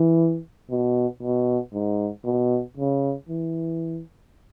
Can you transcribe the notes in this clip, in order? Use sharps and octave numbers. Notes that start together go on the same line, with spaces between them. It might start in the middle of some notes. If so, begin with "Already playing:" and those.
Already playing: E3
B2
B2
G#2
B2
C#3
E3